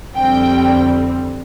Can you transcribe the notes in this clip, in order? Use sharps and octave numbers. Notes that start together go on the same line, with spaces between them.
F2 D3 G3 C4 G5